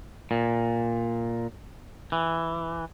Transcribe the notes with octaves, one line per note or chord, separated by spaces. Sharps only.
A#2
E3